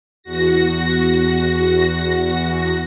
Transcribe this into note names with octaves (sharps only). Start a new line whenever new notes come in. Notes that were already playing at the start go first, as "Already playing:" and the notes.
E2 F#4 A#6